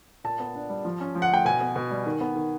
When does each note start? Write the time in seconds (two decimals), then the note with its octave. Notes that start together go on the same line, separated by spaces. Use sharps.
0.24 A#2 A5
0.39 B3
0.55 D4
0.69 G3
0.85 F3
1.00 C#4
1.15 F3
1.22 F#5
1.30 A3 G5
1.45 B2 G#5
1.60 B3
1.76 B2
1.91 G3
2.06 D#3
2.20 B3
2.36 D#3